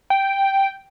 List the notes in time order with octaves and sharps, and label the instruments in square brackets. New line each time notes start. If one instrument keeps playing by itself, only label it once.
[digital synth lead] G5